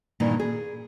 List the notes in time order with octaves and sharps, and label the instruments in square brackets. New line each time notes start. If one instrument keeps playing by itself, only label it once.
[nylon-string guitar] G2 A#2 D#3 E3
G#4